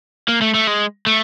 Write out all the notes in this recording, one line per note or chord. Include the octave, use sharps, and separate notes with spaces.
A#3
A3
A3
G#3
A3